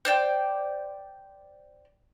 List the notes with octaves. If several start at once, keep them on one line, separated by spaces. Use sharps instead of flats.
C5 D5 G5